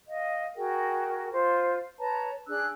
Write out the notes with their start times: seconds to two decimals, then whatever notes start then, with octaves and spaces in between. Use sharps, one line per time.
0.08 D#5 F5
0.56 F#4 G#4 A#4 G5
1.32 F4 C5
1.99 B4 C#5 A5 A#5
2.48 D4 G#4 E6 F#6